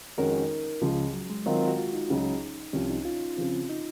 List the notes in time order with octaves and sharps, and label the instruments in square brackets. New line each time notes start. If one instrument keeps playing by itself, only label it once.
[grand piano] F2 D#3 G#3 C#4 F#4 [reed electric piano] A#4
[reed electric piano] D#4
[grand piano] C#2 C#3 F3
[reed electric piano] F#3
G#3
[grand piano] D#3 F#3 C4 F4 A#4
[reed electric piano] F#4
F4
D#4
[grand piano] C#2 C#3 F#3
[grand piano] C2 C3 F3 [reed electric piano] C#4
[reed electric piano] D#4
F4
[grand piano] C#3 F3 C4
[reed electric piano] D#4